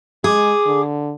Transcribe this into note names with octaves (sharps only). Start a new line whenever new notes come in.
G#3 G#4 D6
D3